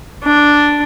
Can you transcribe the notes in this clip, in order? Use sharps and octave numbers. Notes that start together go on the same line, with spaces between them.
D4